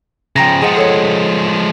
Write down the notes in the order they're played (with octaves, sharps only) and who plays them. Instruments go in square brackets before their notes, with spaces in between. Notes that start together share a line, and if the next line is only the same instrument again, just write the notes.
[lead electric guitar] C#3 F3 [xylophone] G5 A#5 A#6
[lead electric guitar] F3 G#3 [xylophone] G#4 D#5 F#5
[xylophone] A4 C#5 F#5